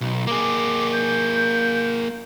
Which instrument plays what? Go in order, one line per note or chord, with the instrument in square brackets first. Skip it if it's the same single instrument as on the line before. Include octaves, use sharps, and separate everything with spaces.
[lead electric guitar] B1
[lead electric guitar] A#3 G#4 [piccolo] D6
[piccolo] G6